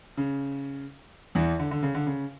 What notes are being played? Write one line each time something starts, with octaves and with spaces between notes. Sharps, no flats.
C#3
E2 E3
D3
D3
C#3
D3
C#3